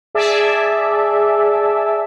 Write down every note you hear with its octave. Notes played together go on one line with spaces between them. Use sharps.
G#4 D5 E5 A5